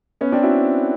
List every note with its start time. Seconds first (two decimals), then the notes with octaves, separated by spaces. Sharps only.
0.21 B3 C#4
0.32 C4 D4
0.43 E4 F#4